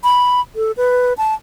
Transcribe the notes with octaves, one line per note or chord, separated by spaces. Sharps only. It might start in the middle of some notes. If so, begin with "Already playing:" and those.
B5
A4
B4
A5